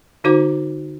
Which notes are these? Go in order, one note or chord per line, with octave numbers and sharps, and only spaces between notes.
D3 D#4 F#4 C5 D6